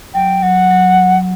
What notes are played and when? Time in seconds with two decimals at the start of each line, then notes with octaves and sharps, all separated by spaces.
0.14 F#3 G5
0.42 F#3 F#5
0.71 F#3